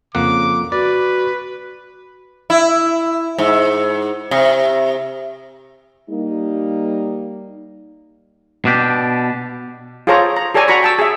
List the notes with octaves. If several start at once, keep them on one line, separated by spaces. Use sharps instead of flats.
F2 C#3 A#3 F#5 D6
F#4 B4 D5
E4
G#2
C3
G3 A#3 D#4
B2 D4 G4
F4 G#4 A4 C5 C#5 A#5
A#5
G4 A4 C#5 D5 G#5 A#5
F#4 A#5 B5 C#6
G5 A5 E6
G#4 E5